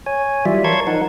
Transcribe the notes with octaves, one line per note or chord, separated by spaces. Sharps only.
C#5 G#5
E3 F#3 G3 F4 D5 E5
A#4 C#5 A5 C6 C#6 G#6
F3 D#4 A#4 F#5